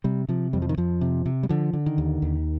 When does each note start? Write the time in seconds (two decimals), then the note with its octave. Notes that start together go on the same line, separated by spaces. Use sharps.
0.04 C3 G3
0.29 C3 F3
0.53 F2 G3
0.62 F3
0.69 D#3
0.77 F2 F3
1.01 C3
1.26 C3
1.43 G3
1.49 D3 F3
1.73 D3
1.86 D#3
1.98 D#2
2.22 D#2